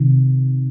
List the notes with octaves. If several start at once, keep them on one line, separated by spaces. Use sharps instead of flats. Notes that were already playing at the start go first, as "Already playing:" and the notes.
Already playing: C3 D#3